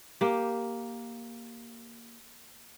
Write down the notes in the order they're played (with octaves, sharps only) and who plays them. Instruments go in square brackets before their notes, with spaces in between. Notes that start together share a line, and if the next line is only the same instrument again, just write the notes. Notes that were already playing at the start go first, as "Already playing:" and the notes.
[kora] A#3 G4